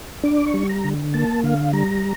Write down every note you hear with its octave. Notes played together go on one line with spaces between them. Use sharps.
D4 D6
C#6
G3
A#5
D3
A#3 A5
D3 F5
G3 A#5